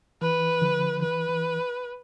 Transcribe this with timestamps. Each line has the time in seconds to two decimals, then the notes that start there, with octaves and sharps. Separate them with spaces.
0.22 E3 B4
0.61 D3 F3
1.02 E3 B4
1.29 E3